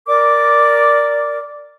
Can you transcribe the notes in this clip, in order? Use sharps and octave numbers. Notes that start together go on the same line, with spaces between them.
A#4 D5 D6